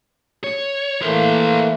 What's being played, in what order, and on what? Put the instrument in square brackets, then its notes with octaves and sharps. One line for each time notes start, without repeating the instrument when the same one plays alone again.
[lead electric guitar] C#5
[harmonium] E3 A3 A#3 [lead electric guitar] A#4 C5